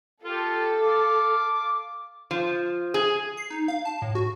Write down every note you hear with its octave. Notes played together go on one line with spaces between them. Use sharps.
F4 G4 A4
F5 D6
F3
G#4
C7
D#4
F5
A5
A2
F#4